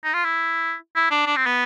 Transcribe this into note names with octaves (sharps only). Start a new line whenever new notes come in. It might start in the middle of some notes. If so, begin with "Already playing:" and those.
D#4
F4
E4
E4
D4
D4
C4
B3